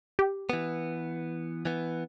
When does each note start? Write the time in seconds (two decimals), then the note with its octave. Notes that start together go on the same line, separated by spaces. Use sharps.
0.19 G4
0.50 E3 B3
1.65 E3 B3